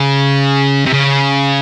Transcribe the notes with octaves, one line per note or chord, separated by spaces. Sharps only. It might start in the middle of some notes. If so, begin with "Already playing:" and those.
Already playing: C#3
C3
C#3